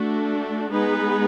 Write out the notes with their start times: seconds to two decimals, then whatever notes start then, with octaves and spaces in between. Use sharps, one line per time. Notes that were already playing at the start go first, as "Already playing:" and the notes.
Already playing: A3 D4 F#4
0.72 G#3 B3 D#4 G#4 B4